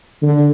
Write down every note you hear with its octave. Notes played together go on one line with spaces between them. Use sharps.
D3